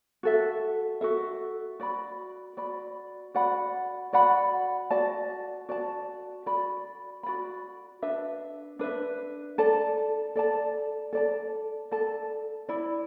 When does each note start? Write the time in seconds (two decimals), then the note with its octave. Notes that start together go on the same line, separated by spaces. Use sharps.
0.23 F#4 A4 E5
1.01 F#4 A4 E5
1.80 F#4 D5 B5
2.57 F#4 D5 B5
3.34 F#4 D5 F#5 B5
4.13 F#4 D5 F#5 B5
4.91 F#4 D5 A5
5.69 F#4 D5 A5
6.46 F#4 D5 B5
7.23 F#4 D5 B5
8.02 D4 B4 E5
8.79 D4 B4 E5
9.58 A4 D5 A5
10.36 A4 D5 A5
11.13 A4 D5 A5
11.91 A4 D5 A5
12.69 E4 D5 B5